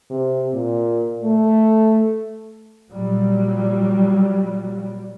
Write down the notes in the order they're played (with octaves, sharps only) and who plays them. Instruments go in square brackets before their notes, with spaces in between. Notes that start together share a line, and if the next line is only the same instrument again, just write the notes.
[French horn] C3
A#2
A3
[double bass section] A#2 F#3 G3